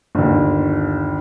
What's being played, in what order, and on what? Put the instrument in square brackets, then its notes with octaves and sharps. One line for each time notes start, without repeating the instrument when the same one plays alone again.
[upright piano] G1 D#2